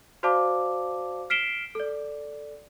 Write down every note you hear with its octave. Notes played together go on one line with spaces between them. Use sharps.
F#4 C5 D5 F5 A5 D6
F6 B6 C7 D7 E7 G7
A4 D5